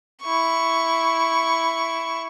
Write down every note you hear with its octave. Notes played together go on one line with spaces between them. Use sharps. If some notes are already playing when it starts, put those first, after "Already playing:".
E4 C#6